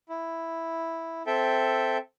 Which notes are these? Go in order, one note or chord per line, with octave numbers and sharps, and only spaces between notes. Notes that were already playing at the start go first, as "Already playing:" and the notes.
E4
C4 A4 E5 G5